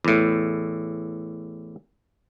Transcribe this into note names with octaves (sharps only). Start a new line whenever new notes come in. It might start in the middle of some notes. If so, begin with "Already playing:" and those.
E2 A2